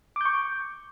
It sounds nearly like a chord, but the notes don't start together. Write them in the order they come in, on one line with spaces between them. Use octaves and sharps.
D6 G6 C#6